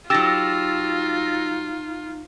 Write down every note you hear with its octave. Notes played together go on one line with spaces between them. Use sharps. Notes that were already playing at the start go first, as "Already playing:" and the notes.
F#3 D#4 F4 G4 E6 A6 A#6